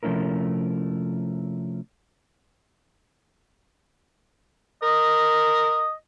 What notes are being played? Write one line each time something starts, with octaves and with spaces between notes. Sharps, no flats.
C3 F3 A3 C#4 E4 A#4
A#4 D#5